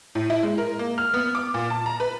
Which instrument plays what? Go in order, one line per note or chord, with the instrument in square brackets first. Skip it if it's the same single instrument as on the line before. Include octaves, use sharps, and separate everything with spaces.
[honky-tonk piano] A2
E4
G#3
A#4
A#3
F6
B3
D6
A#2
A5
A#5
B4